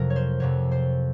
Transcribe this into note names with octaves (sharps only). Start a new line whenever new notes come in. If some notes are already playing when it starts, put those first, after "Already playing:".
Already playing: F2 C3 F#3 A#4
C#5
C5
F2 C3 F#3 C#5
C5